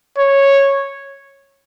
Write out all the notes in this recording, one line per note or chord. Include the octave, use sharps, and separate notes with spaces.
C#5